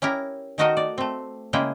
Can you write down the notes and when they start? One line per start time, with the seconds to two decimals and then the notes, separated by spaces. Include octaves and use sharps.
0.02 C#4 E4 G4 A#4
0.58 D#3 A3 D#4 F#4 A#4 D#5
0.77 D5
0.98 A3 C4
1.53 C#3 G#3 A#3 E4 G5